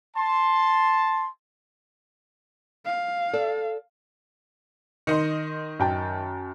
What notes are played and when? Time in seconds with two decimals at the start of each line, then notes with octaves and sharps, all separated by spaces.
0.16 A5 C6
2.85 F5
3.33 A4 D5
5.07 D#3 D#5 C6 C#7
5.79 F#2 G5 A5